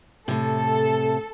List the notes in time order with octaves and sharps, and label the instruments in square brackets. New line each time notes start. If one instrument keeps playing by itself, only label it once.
[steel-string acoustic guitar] A2 C3 [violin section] A4